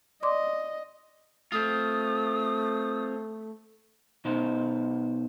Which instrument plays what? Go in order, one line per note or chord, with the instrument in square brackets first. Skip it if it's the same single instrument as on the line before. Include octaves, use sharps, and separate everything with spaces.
[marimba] D5 C6 D6 [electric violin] D#5
[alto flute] A3 [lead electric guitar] C4 F4 [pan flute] D#6
[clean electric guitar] B2 D#4 C5